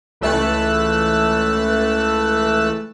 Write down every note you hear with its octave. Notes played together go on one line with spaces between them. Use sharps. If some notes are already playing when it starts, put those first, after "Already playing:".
C#2 E3 A3 A5 E6 F#6